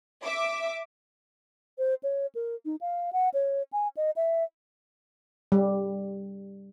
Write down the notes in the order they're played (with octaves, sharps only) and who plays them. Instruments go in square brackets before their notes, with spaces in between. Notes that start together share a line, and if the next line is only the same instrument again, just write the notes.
[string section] E5 D6
[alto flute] C5
C#5
A#4
D#4
F5
F#5
C#5
G#5
D#5
E5
[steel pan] G3